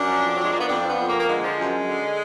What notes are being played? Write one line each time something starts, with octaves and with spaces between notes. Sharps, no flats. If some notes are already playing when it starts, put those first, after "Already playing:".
Already playing: F#2 D4
F3
F2
F3 F#3
G#3
F3 A#3
B3
F2 D4
F3 B3
F2
A#3
F3
A#3
D3 G#3
F3
F#2
F#2
D3